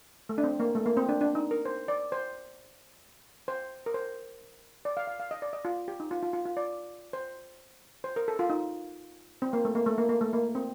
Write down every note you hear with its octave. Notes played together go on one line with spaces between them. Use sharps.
A3
D4
C4
A#3
A3
A#3
C4
D4
D4
D#4
A#4
C5
D5
C5
C5
A#4
C5
D5
F5
F5
F5
D#5
D5
D#5
F4
G4
D#4
F4
F4
F4
F4
D5
C5
C5
A#4
A4
F4
D#4
C4
A#3
A3
A#3
A3
A#3
A#3
A3
A#3
C4